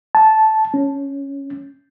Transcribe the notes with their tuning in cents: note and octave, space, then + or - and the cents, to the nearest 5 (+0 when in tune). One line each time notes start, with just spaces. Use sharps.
A5 -10
C#4 +0